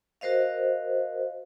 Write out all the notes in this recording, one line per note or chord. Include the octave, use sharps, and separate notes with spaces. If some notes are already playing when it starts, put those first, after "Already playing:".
F#4 A#4 C5 D#5 F5